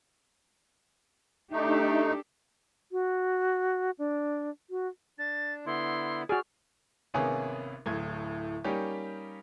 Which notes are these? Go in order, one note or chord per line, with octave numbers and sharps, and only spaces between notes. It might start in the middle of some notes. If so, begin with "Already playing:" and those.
A3 D4 D#4 G4 A4
F#4
D4
F#4
D4 A6
D3 B3 E4 C6
F#4 G#4 D5 F6
G#1 C3 A#3 B3 C#4 G#4
D1 A2 G#6
G3 A#3 C#4 D#4 G4